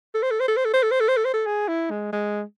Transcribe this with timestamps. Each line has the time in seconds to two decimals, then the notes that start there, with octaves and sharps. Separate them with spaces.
0.14 A4
0.23 C5
0.31 A4
0.40 C5
0.48 A4
0.57 C5
0.65 A4
0.74 C5
0.83 A4
0.91 C5
1.00 A4
1.08 C5
1.17 A4
1.25 C5
1.34 A4
1.46 G#4
1.68 E4
1.90 G#3
2.13 G#3